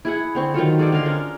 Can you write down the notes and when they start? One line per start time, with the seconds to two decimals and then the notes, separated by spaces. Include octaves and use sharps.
0.05 E4 G#4 F#5
0.35 D3 C4 C#6
0.54 D#3 F#3 F4 A4
0.79 G#4 A4 C5 D5
0.92 D3 D#5 F5 C6
1.05 C#4 D4 A#4